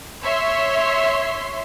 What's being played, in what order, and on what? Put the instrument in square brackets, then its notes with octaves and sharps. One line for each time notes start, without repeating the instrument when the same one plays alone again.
[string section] C#5 E5 C6